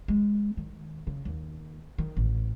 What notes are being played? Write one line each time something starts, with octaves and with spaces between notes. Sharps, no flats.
G#3
D#3
C#3
D#2
D#3
A1